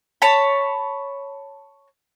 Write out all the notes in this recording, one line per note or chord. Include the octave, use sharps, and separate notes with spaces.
C#5 A5 B5